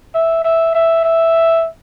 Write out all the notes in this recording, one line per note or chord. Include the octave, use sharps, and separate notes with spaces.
E5
E5
E5
E5